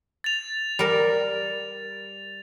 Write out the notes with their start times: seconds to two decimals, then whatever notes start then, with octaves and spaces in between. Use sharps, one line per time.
0.24 A6 F7
0.79 G3 A#4